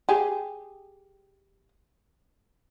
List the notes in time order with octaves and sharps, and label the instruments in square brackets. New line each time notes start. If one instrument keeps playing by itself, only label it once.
[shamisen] G4 G#4